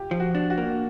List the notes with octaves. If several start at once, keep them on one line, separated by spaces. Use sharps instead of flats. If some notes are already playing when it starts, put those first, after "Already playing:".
Already playing: F4 G4
F3
F#4
D4
F#4
A#3